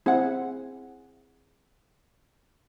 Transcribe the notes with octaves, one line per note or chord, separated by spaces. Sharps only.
C4 E4 G#4 F#5